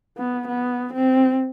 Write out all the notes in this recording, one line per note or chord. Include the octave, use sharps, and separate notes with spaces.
B3
B3
C4